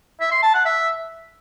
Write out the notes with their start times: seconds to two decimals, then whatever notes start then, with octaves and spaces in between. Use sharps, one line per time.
0.20 E5
0.32 C6
0.43 A5
0.54 F#5
0.65 E5